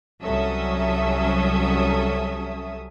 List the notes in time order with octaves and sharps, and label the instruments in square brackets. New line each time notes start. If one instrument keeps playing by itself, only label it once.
[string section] C2 F#3 C#4 A4 E5 D#6